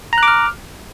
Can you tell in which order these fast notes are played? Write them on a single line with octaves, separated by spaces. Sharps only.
A#5 F#6 D6 F6